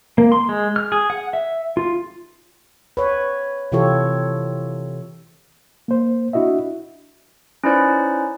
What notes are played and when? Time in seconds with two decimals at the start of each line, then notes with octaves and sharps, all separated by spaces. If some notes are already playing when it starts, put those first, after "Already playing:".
0.18 A#3
0.32 C6
0.49 G#3
0.76 F6
0.92 G#4
1.10 F#5
1.33 E5
1.77 F4
2.97 B4 C#5
3.72 C3 E3 F4 G4 A4 C#5
5.88 A#3 C5
6.33 D4 E4 F#4 D#5 E5
7.64 C#4 D#4 E4 B4 C5 D5